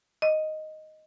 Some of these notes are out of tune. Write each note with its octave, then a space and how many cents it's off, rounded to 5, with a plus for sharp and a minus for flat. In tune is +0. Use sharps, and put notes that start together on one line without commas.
D#5 +0